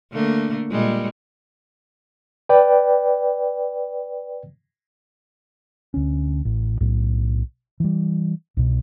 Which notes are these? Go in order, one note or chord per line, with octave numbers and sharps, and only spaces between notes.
D3 A3 A#3
A#2 G3 G#3
B4 D5 G5
D2 C#4
A1
B1 A2
E3 G3
C2 B2